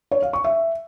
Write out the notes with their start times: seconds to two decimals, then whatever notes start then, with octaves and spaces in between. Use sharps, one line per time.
0.11 C#5
0.22 F5
0.33 C#6
0.44 E5